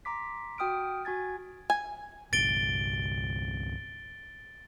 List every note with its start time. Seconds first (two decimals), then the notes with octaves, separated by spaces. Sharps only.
0.05 A#5 C6 D6 B6
0.58 F#4 G5 D#6 F6 D7
1.05 F#4 G#5 G#6 A6
1.70 G#5
2.33 G1 C2 A6 D7 G7